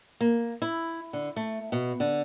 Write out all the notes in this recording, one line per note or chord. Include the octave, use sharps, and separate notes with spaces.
A#3
E4
D3
A3
B2
D3